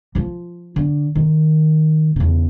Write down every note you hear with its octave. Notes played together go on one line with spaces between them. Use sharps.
F3 F4
D3
D#3
E2 C#3